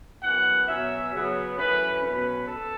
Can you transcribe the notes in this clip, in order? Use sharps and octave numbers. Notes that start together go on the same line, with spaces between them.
F#2 E3 B3 F#5
B2 F#3 C#4 E5
C#3 F#3 B3
F#2 E3 A3 C#4 B4
B2 F#3 C#4 B4
A4